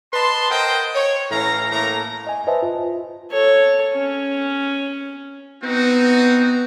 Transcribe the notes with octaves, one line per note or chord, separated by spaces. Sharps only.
B4 D#5 A5 C6
A#4 C5 D#5 F#5 G5
C#5
A2 E3 C#4 F5 A#5
A2 A3 A#3 A#5
D#5 G#5
B4 C5 D#5 E5 G#5 A5
F4
A4 C#5
C#4
B3 C4 D#4 F#4